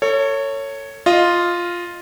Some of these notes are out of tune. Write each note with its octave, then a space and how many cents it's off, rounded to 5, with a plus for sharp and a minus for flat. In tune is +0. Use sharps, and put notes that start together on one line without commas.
A4 +40 C#5 +0
F4 +0 D#5 +0